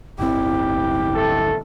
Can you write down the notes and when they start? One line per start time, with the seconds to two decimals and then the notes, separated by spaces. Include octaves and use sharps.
0.19 D1 G1 C4 E4 G4
1.15 A3 A4